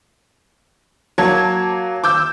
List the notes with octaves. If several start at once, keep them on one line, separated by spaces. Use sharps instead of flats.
F#3 A#3 A5 G#6
D6 E6 G6